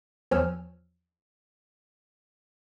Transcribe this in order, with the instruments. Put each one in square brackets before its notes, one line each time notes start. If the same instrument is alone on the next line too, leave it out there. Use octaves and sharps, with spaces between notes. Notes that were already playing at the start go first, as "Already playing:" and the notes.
[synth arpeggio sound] E2 F3 C#5 G#5 E6 F6